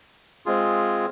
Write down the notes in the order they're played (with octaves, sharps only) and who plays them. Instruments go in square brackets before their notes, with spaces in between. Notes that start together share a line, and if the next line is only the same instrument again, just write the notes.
[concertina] G#3 C4 F4 G#4